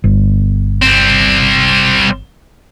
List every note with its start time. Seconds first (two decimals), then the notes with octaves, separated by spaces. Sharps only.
0.04 G1
0.82 G3 C4